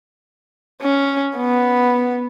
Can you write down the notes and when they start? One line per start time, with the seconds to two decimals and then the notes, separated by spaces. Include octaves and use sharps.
0.82 C#4
1.36 B3